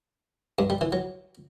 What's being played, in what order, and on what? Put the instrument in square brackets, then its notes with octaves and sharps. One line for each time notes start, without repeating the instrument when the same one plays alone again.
[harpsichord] G2
G3
E3
F#3